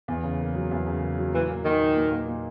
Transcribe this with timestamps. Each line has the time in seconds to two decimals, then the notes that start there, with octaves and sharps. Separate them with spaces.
0.08 E2
0.23 C#3
0.40 A#3
0.54 F#3
0.71 E2
0.86 C#3
1.01 A#3
1.18 F#3
1.33 A#2 E3
1.49 A#3
1.64 A#2 D#3
1.81 D#4
1.95 A#2
2.11 A#3
2.27 A#2